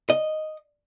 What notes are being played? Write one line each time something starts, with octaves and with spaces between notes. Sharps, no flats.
D#5